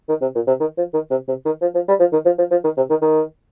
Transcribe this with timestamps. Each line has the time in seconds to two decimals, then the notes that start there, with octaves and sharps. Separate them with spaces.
0.09 D#3
0.22 C3
0.35 A#2
0.47 C3
0.60 D#3
0.78 F3
0.94 D#3
1.10 C3
1.28 C3
1.45 D#3
1.62 F3
1.75 F3
1.88 G3
2.00 F3
2.13 D#3
2.25 F3
2.38 F3
2.51 F3
2.64 D#3
2.77 C3
2.90 D#3
3.02 D#3